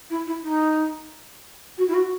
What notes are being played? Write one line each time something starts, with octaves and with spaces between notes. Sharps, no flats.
E4
E4
D#4
F#4
E4
F#4